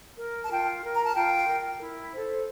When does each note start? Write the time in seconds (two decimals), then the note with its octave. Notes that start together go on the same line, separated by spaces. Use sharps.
0.18 A#4
0.43 A5
0.50 F4 G5
0.83 A#4
0.94 A#5
1.05 A5
1.15 F4 G5
1.48 A#4
1.80 E4
2.13 A4 C5